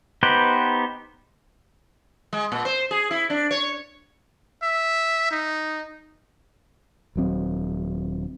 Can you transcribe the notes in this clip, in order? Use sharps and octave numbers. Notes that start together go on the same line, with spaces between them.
B3 D#4 G4 B4 C5
G#3
A#2
C5
G#4
E4
D4
C#5
E5
D#4
D#1 F#3 C4